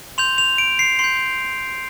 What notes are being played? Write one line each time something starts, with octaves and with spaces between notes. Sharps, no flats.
C6 G6 F7
F7
D7
C7
C6 G6 C7